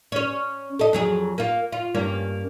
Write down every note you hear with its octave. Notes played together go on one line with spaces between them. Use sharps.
C#4 C#5
A4 D#5
F2 F#3 G#4
A#3 F4
F4
G2 A#3 C#4